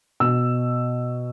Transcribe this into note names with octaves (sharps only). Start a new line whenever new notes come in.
B2 E6